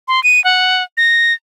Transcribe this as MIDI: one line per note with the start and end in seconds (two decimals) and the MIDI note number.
0.08 0.23 84
0.24 0.43 99
0.44 0.83 78
0.97 1.33 94